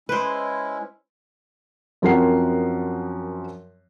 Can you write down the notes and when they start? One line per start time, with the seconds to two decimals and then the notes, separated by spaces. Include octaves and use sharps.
0.09 G#3 C#4 E4 B4 C5
2.02 F#2 F3 C4 A#4 F#5 C7